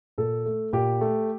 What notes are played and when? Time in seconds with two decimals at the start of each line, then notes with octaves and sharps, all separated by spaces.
0.18 A#2 A4
0.46 A3
0.73 A#2 G4
1.01 A3